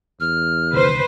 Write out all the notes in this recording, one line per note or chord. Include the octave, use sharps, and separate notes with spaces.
E2 F6
C2 D3 D#3 B4 C5